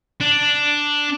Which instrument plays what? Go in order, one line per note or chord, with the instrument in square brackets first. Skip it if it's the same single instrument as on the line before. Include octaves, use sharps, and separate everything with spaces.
[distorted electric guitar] D4